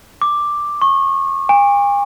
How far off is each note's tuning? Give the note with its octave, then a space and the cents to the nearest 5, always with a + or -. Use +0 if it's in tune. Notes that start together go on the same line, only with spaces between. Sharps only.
D6 +5
C#6 -25
G#5 -45